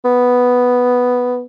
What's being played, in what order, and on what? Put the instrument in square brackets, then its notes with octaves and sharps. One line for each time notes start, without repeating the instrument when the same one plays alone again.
[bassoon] B3